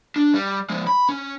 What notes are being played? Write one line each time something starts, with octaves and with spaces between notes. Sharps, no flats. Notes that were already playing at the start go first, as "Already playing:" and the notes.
D4
G3
F3 G#3
B5
C#4